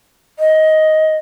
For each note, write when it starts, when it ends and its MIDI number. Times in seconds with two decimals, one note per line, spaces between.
0.39 1.17 75